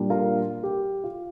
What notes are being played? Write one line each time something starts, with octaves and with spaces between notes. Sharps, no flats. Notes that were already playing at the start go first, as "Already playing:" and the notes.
Already playing: A#2 G3 D4
F4 A#4
G4
F4